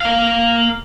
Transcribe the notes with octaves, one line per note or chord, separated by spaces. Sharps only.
A#3 F5